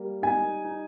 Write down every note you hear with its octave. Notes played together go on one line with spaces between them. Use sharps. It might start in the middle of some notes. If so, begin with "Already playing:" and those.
Already playing: G3 A#3
D#4 G#5
D#4